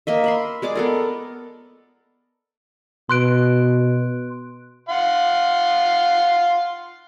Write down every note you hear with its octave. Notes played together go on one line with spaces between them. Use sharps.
A#3 D#5 E5
E5 B5 C6
G#3 G#4 D5 D6
B3 A4 A#4
B2 C6 F#6 D7
F5 F#5 C6